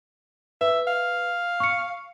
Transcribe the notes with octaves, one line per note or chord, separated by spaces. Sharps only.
B4 E5
F5
C#6 C#7